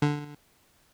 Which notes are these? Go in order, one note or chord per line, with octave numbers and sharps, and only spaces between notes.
D3